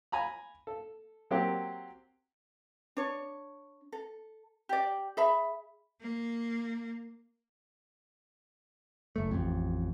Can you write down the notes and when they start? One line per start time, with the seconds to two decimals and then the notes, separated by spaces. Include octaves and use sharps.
0.12 G#5 A#5 B5
0.67 A4
1.31 F#3 A#3 C4 G4
2.97 D4 C#5
3.92 A4
4.69 G4 D5
5.17 G#4 E5 B5
6.00 A#3
9.16 F#1 A3
9.31 A1 F2